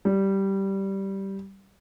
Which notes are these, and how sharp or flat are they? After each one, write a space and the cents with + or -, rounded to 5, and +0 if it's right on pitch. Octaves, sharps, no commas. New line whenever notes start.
G3 -10